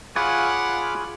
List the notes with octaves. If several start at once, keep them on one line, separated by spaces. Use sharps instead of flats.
F4 G#4 C#5 F#5 B5 D6 F6